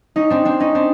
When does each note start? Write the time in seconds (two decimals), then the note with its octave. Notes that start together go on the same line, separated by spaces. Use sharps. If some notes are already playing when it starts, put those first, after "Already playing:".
0.16 C#4 D#4
0.30 C4 D4
0.45 C4 D4
0.60 C#4 D#4
0.75 C4 D4